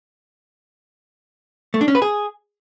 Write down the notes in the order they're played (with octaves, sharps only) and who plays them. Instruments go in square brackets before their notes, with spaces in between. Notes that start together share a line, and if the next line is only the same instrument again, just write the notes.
[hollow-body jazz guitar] A3
D4
C#4
B4
G#4